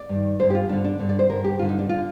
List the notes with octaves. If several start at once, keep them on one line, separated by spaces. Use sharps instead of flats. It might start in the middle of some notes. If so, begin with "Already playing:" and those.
Already playing: D5
G2 D#3
G2 D3 C5
G4
F4
G2 D3 D4
D4
G2 D3
D5
C5
G2 D3 A#4
G4
G2 D3 F4
D#4
D4
D3 F4